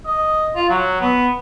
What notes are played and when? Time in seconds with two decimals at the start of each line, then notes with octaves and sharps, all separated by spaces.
0.06 D#5
0.56 F4
0.69 F#3
1.01 B3